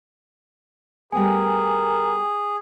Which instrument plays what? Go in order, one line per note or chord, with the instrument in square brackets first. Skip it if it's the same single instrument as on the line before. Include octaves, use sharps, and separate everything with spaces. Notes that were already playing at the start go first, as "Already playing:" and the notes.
[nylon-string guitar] G3 A3 B3 [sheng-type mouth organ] G#4 [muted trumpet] A#4 [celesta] G5 G#5